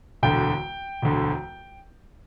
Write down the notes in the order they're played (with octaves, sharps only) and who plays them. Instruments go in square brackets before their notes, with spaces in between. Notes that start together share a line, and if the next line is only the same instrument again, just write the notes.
[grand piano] E1 D2 D3 G5
E1 D2 D3